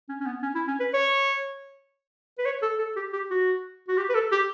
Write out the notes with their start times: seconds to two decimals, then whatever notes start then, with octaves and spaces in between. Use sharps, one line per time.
0.09 C#4
0.20 C#4
0.26 B3
0.42 C#4
0.55 E4
0.67 C#4
0.80 B4
0.94 C#5
2.38 B4
2.45 C#5
2.62 A4
2.79 A4
2.96 G4
3.13 G4
3.30 F#4
3.88 F#4
3.98 G4
4.09 B4
4.14 A4
4.32 G4